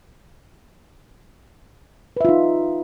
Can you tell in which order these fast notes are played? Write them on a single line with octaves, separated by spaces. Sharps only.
B4 E5 F4 D#4